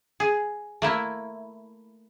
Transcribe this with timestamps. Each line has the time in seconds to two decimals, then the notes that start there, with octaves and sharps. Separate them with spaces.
0.20 G#4
0.82 A3 A#3 E4